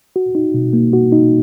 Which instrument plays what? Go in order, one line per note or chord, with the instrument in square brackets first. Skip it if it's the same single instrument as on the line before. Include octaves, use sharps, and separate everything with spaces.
[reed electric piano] F#4
D#4
B2
A#3
F#4
D#4